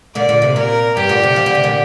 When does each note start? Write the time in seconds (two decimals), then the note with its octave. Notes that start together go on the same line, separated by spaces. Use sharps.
0.15 A#2 D3 D5
0.29 A#2 D3
0.42 C3
0.56 A#2 A#4
0.96 G2 G4
1.09 A#2 D3
1.23 C3
1.36 F3
1.46 D3
1.55 C3
1.64 A#2 D3